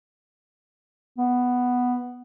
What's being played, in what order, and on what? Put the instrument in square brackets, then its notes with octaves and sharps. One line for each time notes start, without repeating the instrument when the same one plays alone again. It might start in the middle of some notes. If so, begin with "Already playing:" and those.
[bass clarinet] B3